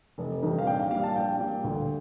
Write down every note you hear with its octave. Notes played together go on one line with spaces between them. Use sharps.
F1
F2 C3 D#3 G3
F5
A#1 G5
F5
A#2 G3 F5
A5
A#1 G5
A#2 G3
D2